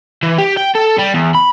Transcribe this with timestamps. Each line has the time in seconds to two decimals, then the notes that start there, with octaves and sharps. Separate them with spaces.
0.23 E3
0.38 G4
0.57 G5
0.75 A4
0.98 G3
1.14 E2
1.35 B5